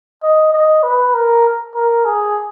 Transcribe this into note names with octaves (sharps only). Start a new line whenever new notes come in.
D#5
D#5
B4
A#4
A#4
G#4